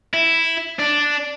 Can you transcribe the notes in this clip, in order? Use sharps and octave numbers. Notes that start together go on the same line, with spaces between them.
E4
D4